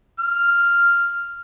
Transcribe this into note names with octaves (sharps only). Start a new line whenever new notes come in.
F6